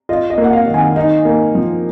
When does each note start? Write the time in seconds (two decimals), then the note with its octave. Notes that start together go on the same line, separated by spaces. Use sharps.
0.09 F4 D#5
0.30 D#5
0.38 A#3
0.44 F#5
0.53 F5
0.67 D#3
0.74 G#5
0.96 D#4
1.25 A#3
1.55 F3